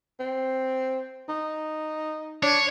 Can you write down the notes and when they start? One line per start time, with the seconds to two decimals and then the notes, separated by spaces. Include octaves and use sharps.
0.20 C4
1.29 D#4
2.43 D4 C#5